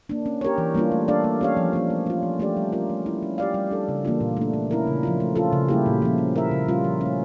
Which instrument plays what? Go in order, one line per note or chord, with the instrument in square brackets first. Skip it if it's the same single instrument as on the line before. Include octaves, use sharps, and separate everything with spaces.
[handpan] A#3 D4
C#4
G4 A#4 C#5
E3
G3 A#3 D4 F4
A3
D4 A4 D5 F5
A#3
C#4 G4 C#5 F5
F3
A#3 C#4
A3
C#4 F4
F3
A3 D4 G4 D5
G3
C#4 F4 A#4
A3
C#4 E4
C#4
G4 D5 F5
G3
D4 A4
C#3
E3 A#3 D4 F4
A#2
A3 D4
A#3
C#4 E4 A#4
C#3
F3 C#4 F4
A3
C#4 F4 A4
C#3
G3 A#3 E4 G4
A#2
F3 C#4
C#4
E4 A#4 E5
C#3
G3 C#4 F4
F3
C#4
A3